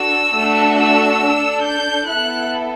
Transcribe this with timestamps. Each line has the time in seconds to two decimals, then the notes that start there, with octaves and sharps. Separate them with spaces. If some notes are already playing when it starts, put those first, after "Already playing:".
Already playing: D4 F#4 A4 E6
0.37 A3 D4 F#4 A4
0.80 E6
1.23 D4 A4
1.66 G6
2.09 B3 E4 A4 F#6